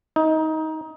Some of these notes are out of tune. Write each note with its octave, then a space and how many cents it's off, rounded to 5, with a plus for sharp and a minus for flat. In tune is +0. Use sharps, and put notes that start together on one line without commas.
D#4 +20